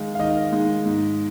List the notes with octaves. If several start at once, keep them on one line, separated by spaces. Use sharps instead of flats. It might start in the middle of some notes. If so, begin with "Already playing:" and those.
Already playing: D#3 G#3 D#4 F5
F5
D#3 D#5
G#3 D#4
G#2